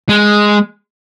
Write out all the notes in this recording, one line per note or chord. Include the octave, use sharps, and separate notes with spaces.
G#3